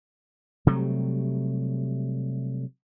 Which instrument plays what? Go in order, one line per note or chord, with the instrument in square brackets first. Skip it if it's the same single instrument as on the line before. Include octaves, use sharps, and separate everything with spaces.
[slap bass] C3 F#3 G3 A3